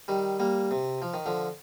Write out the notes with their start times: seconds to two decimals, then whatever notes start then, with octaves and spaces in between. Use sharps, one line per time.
0.08 D#3 G3
0.40 G3 A#3
0.71 C3
1.02 F3
1.14 D#3
1.26 D3 F3